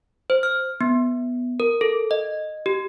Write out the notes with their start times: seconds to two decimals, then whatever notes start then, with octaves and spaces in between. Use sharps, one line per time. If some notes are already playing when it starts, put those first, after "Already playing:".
0.30 C5
0.43 F6
0.81 B3
1.60 A#4
1.81 A4
2.11 D#5
2.66 G4